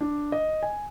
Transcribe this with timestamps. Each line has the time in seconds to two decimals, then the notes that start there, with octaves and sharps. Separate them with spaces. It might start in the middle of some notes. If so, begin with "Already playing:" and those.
0.01 D4
0.32 D#5
0.63 G#5